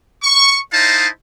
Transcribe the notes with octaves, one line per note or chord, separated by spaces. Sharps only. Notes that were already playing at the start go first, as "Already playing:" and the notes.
C#6
D#4 E4 C5 D#5 F5 A5